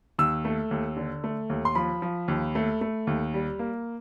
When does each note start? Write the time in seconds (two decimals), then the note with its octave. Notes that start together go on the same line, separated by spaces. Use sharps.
0.19 D#2 E6
0.45 A3
0.71 D#2
0.97 D3
1.24 A3
1.50 D#2
1.65 C6
1.75 F3 B5
2.02 F3
2.28 D#2
2.55 A3
2.81 A3
3.07 D#2
3.34 G3
3.59 A#3